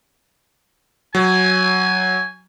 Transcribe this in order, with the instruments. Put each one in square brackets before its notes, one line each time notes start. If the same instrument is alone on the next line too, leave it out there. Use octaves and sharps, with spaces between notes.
[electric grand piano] F#3 [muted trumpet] G#5